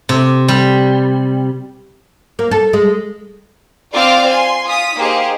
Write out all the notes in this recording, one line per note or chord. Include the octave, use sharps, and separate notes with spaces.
C3
G3
A#3
A4
G#3
C4 F4 D5 F5 D6 F6
G#5 C6
F4 D#6 B6
A#3 D#4 G4 G#4 C5